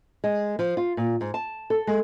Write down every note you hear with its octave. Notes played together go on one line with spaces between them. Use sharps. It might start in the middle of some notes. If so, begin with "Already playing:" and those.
G#3
F3
F4
A#2
G#2
A5
A4
G#3